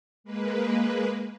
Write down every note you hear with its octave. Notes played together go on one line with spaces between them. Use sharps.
G#3 A#3 B4